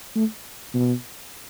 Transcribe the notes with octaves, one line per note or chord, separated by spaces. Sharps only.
A3
B2